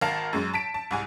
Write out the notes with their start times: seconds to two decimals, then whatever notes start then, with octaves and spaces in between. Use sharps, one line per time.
0.01 G#1 A#4 F5 A5 C7
0.33 F#2 G#3
0.53 A5 B6 D7
0.74 A5
0.91 C2 G#2 G#5